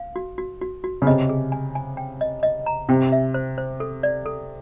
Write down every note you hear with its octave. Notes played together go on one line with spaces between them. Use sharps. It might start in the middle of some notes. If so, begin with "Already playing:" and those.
Already playing: F5
F#4
F#4
F#4
F#4
C#3
C3 D#5
G#4
G#5
G#5
G5
D#5
D#5
A#5
C3 G5
E5
C5
C5
A4
D5
A4